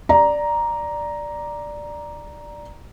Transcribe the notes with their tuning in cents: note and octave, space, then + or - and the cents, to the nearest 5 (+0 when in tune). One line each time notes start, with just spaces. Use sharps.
D5 +5 A#5 +5